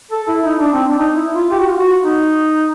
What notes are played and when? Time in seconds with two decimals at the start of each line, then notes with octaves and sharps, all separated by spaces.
0.11 A4
0.28 E4
0.45 D#4
0.59 D4
0.73 C4
0.86 D4
0.99 D#4
1.16 E4
1.34 F4
1.51 G4
1.60 F#4
1.69 F4
1.78 F#4
2.04 D#4